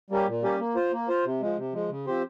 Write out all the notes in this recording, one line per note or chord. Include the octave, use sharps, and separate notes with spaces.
G3 A#3 C#4 G4
A#2
G3 A#3 C#4 G4
A#3
F4 C5
A#3
F4 C5
C3
F3 G#3
C3
F3 G#3
C#3
F3 C4 G4 C5